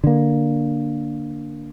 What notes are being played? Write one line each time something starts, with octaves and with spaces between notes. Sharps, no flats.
D3 A#3